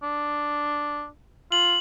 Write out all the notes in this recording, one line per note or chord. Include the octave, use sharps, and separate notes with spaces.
D4
F4 F#7